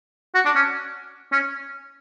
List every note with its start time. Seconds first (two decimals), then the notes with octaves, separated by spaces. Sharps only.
0.35 F#4
0.45 D4
0.55 C#4
1.32 C#4